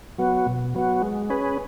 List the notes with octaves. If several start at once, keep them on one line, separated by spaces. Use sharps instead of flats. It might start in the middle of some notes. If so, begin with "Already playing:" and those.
F#3 B3 F#4
B2
F#3 B3 F#4
G#3
C#4 G#4 B4